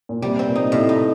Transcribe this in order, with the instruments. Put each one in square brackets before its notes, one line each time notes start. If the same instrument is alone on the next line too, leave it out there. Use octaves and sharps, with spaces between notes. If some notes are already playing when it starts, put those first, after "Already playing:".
[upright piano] A#2
[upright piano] C3 [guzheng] G3
[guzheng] C4
[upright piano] A#2
[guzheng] D#4
[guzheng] A2 [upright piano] C3
[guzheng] D#4